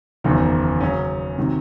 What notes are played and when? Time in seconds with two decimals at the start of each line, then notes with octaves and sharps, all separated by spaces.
0.24 F#1 E2 D#3 F#3
0.80 C#3 F#3 C#4
1.37 C3 D#3 F#3